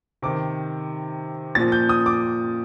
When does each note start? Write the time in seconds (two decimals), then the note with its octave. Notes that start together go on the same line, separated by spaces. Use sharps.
0.22 C3 D#3 D6
1.55 A#2 F3 A6
1.72 G6
1.89 D#6
2.06 D6